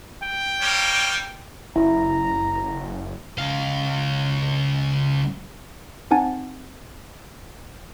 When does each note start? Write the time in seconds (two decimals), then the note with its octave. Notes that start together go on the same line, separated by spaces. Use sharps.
0.22 G5
0.61 G3 A#3 C#5
1.76 F#1 E4 A#5
3.38 C#2 F5
6.11 C4 D#4 F#5 G#5 A5